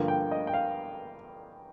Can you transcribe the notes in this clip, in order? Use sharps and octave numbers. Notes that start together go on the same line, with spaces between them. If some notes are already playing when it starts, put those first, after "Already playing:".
Already playing: G2 D3 F3 A#3
G5
D#5
G5
F5